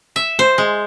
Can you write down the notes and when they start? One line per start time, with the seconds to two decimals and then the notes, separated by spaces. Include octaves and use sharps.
0.16 E5
0.39 C5
0.58 G#3